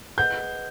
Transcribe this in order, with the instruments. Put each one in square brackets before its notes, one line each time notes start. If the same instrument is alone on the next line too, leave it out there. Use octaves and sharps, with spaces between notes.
[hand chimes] G#4 B4 D#5 F#5 [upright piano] G6